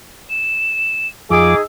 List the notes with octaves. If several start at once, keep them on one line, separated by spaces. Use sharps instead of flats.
E7
F2 F3 D#4 G#4 D6 E6